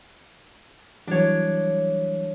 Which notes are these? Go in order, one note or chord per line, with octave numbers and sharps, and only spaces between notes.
E3 F#3 G3 D4 C#5